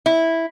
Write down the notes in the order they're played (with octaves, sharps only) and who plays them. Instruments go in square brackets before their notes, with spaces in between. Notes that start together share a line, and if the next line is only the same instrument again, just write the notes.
[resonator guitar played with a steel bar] E4